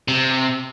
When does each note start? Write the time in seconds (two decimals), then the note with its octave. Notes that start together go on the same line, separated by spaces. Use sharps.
0.08 C3